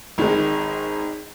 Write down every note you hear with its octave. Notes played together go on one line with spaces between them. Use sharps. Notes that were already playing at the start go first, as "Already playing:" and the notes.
G#1 D#3 G#3